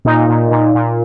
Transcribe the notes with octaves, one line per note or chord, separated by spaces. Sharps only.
A#2 D#4
A#2
A#2
A#2